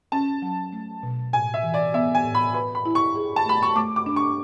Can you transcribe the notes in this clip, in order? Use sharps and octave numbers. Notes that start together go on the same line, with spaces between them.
C#4 A5
F#3
A3
B2
A2 G#5
E5
E3
D5
B3 E5
G#5
A2
B5
B4 B5
B5
E4
C#6
G#4
A5
A3 B5
C#6
A3 D6
D6
D4
C#6